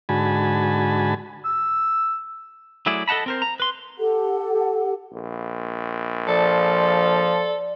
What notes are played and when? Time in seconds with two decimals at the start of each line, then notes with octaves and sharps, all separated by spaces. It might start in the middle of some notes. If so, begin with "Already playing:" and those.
0.09 G#2 D3 F#4 G#5 A5 B5
1.45 E6
2.86 F#3 A3 E4 G#4 D5
3.08 A4 D#5 F#5 A5 B5
3.26 C4 A#4 C5
3.42 A#5
3.60 B4 C6
3.98 G4 A4 F#5
5.13 A#1
6.28 F3 A4 D5